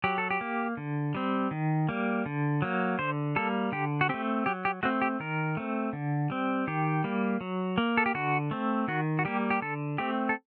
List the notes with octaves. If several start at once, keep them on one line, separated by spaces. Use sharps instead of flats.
F#3 G4
A4
G4
A#3
D3
G3 C4
D#3
G3 A#3
D3
F#3 A#3
D3 C5
G3 A#3 A4
D3 G4
F#4
A3 C4 G4
F#3 G4
G4
A3 C4 F#4
G4
D#3 A#4
A3 C4
D3
G3 C4
D#3 G4
G3 A#3
F#3
A#3
A4
G4
D3 F#4
A3 C4
D#3 F#4
F#4
G3 A#3 G4
G4
D3 A4
A3 C4 G4
A4